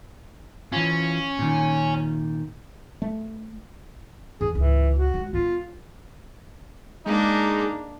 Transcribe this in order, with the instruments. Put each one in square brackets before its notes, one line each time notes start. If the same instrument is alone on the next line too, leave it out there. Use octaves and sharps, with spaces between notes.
[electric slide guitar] E3 F4 [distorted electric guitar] C#4
[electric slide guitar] A#2 D#3
[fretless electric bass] A3
[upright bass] E2 [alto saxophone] G#4
[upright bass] G#1 C#2 [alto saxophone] E3
[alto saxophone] F#4
[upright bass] G#3
[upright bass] G3 B3 [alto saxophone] F4
[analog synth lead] G#3 [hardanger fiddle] A#3 D4 [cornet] D#4